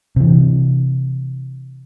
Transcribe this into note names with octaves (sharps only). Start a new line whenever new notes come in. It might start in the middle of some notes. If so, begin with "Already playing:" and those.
C3 E3